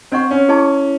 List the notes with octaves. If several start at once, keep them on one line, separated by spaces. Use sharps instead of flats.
C4 C5 D#5 F#5 C#6
C#4
E4 G#4 D#5 A5 C#6